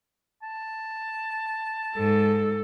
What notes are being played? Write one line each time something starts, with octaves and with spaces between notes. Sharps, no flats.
A5
G#2 A4